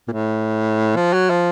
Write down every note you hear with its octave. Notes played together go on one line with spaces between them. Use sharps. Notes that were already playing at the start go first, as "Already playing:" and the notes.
A#2
A2
F3
F#3
F3